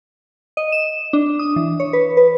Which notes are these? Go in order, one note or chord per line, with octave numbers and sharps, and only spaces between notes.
D#5
E7
D4
D#6
E3
C#5
B4
B4